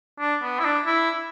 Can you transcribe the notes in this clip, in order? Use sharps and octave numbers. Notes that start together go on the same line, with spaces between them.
D4
B3
E4
D4
E4